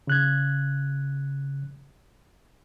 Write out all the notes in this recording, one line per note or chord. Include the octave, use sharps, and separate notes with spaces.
C#3 F#6 G#6